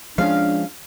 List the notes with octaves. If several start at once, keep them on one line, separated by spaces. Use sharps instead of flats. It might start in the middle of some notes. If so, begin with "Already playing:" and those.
F3 G#3 C#4 D4 F5